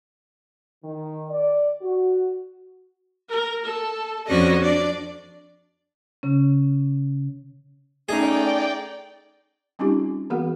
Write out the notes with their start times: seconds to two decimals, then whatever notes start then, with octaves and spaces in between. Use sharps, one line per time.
0.84 D#3
1.30 D5
1.81 F#4
3.29 A#4
3.65 A4
4.27 F2 C#4 F#4 D5 D#5
4.61 D4 D5
6.23 C#3 C#4
8.09 A3 C#4 D#4 G#4 D5 G5
9.79 G3 C4 C#4 D#4 F4 G4
10.30 E3 A#3 B3 F#4 G#4 A#4